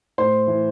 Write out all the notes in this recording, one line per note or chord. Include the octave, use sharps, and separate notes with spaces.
A2 C5 C6
E3